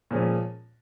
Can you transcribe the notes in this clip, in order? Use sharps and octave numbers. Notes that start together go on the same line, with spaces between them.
A#2 F3 G#3 C#4